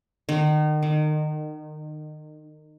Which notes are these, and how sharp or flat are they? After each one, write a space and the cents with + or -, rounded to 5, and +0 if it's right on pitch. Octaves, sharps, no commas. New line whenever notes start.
D#3 -35
D#3 -25